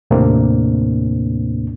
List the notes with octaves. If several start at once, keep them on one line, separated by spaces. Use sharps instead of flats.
D#2 A2 C3 A#3 C4 D4